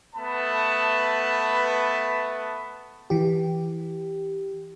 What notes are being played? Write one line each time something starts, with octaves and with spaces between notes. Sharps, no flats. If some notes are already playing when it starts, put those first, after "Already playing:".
A3 B3 B4 A5 B5
E3 G4